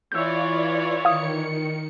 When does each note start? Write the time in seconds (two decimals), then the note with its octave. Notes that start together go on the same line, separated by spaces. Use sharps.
0.12 E3 F4 C#5 D5 E6 G6
1.05 D#3 F5 D#6 C#7